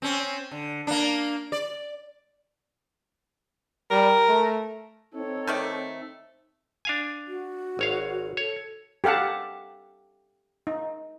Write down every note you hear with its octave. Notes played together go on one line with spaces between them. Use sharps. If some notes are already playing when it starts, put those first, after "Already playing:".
C4 C#4
D3
A#3 D4
D5
G3 A#4
A3
C4 D#4 A4 C#5
D#3 A3 D5
D4 F5 G#5
F#4
G#1 C#5 F5
A4 C#5
G4 A4 F5 F#5 A5
D#4